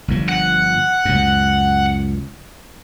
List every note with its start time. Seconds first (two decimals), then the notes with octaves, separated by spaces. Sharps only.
0.08 G1 G2 F3
0.29 F#5
1.05 C#2 F#2